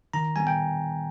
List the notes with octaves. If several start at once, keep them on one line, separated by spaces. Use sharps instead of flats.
D#3 A#5
G3 B3 G#5
G5